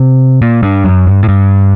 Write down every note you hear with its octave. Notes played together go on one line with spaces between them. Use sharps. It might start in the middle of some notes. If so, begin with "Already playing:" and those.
Already playing: C3
A#2
G2
F#2
G2
A2
G2